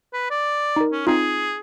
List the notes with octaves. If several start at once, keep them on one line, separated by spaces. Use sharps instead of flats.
B4
D5
D#4 A#4
C#4
C4 D#4 F4 G#4